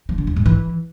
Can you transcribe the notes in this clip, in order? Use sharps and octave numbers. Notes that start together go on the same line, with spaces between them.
F3
D3
E2
G#2
E3